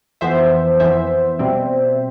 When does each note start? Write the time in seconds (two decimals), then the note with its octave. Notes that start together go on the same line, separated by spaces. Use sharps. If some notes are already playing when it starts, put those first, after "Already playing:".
0.21 F2 E3 B3 C5 E5
0.80 F2 E3 B3 C5 E5
1.39 B2 G3 C4